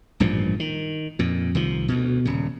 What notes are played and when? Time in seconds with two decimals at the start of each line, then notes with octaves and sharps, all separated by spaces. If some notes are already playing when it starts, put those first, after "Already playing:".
0.20 A1 G2 A#2 F3
0.60 D#3
1.19 F2 A#2
1.55 C2 D#3 F3
1.88 D2 B2
2.25 D#1 C#3